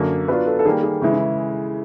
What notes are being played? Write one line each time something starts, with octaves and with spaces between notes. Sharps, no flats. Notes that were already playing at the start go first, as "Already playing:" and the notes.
Already playing: F#2 D3 F#3 A#3
F#3 B3 D4 F4 B4
A4
A4
D#3 G3 A#3 G#4
G#4
C#3 E3 G#3 E4
E4